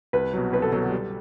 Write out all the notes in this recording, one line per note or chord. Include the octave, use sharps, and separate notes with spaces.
C2 B4
B2 F#3
C2 B4
A4
B2 F#3 A4
G3